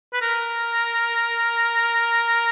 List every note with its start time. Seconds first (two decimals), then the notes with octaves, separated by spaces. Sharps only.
0.13 B4
0.22 A#4